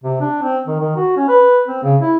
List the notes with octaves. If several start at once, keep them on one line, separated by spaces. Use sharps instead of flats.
C3
D4
C4
D#3
D#3
F#4
C#4
B4
C4
C#3
E4